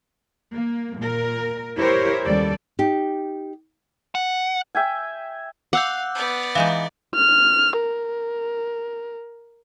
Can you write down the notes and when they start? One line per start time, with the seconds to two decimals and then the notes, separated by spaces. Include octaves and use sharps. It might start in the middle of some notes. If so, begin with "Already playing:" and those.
0.53 A#3
1.00 A#2 A#4
1.76 E4 G4 A#4 C5 C#5
2.24 D#2 C#3 G3 A4 D5
2.79 D#4 G4
4.15 F#5
4.75 E5 G5 G#5
5.73 F5 F#5 D6 E6 G6
6.15 B3 D5
6.55 E3 G#3 D#4 F5
7.15 F6
7.80 A#4